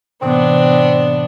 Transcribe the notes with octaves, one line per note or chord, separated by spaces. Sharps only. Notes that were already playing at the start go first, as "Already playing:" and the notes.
A2 C3 E3 B3 C4 D4